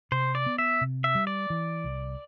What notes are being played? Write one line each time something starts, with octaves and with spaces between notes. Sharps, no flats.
C3 C5
D5
B3
E5
C3
E5
G3
D5
E3
C2